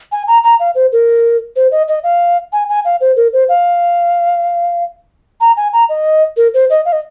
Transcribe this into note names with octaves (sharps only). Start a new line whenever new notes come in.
G#5
A#5
A#5
F5
C5
A#4
C5
D#5
D#5
F5
G#5
G#5
F5
C5
A#4
C5
F5
A#5
G#5
A#5
D#5
A#4
C5
D#5
F5
D#5